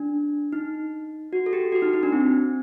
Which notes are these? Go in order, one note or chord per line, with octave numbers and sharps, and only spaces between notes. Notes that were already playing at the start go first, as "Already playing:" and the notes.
Already playing: D4
D#4
F#4
A4
G4
F#4
D#4
D#4
D4
C4